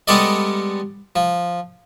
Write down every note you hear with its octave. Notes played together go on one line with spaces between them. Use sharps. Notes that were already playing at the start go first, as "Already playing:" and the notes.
G3 G#3 B3 A4 D5 D#5
F3